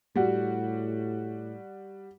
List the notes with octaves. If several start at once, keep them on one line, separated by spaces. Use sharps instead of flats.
A2 G3 F#4